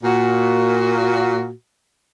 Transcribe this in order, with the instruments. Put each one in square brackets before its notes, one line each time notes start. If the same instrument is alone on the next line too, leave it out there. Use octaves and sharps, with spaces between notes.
[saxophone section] A#2 F#4